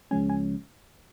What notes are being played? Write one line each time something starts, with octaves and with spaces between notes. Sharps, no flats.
C#2 C#3 F3 G#3 C#4 G#5
G#5